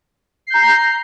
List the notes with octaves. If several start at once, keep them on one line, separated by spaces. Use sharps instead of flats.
A#5 G6 C7